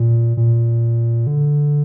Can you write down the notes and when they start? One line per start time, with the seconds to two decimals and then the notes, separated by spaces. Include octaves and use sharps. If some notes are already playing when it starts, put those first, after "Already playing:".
Already playing: A#2
0.37 A#2
1.27 D3